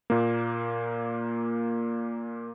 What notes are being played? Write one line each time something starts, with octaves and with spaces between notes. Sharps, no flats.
A#2 A#3